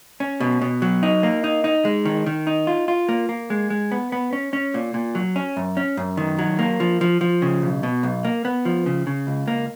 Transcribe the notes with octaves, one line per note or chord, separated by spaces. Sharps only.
C#4
B2
B2
F#3
D#4
A#3
D#4
D#4
G#3
D#3
D#3
D#4
F4
F4
A#3
A#3
G#3
G#3
B3
B3
C#4
C#4
A#2
A#2
F#3
C#4
F#2
C#4
F#2
D#3
F#3
A#3
F3
F3
F3
C#3
B1
B2
B1
A#3
B3
F3
C#3
C#3
C#2
A#3